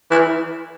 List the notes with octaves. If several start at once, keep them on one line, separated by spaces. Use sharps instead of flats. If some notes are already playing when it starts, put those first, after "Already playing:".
E3